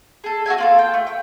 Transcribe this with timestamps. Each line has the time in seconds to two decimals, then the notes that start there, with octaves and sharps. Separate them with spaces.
0.24 G#4 A4
0.46 F#4 G4 E5 G#5
0.58 A#3 F4 A4
0.79 G5
0.94 A3
1.07 G5